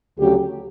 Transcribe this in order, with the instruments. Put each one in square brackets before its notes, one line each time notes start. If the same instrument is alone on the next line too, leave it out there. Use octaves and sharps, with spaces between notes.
[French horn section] D2 C#3 F#3 G4